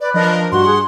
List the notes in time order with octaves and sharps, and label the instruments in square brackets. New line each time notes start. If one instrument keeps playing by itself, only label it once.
[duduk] B4 [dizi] D5
[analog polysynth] F3 D4 A#4 [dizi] D#5
[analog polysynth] G2 F#5 [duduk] F#4 [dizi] C6
[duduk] G#4